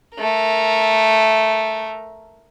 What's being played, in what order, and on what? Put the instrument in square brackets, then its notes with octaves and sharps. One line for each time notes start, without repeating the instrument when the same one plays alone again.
[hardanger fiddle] A3 A#4